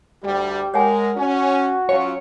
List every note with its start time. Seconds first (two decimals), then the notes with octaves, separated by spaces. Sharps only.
0.24 D2 G3 G4
0.74 G#3 A#4 C#5 F#5 G#5
1.17 C#4 F#4
1.89 F#3 C#4 F4 C#5